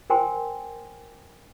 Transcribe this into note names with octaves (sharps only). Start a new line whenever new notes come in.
A#4 C5 G5 G#5 C6